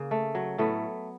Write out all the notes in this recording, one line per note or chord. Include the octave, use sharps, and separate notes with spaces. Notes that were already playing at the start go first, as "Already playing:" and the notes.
Already playing: C#3 A#3
A3
F#3
A2 A3 B3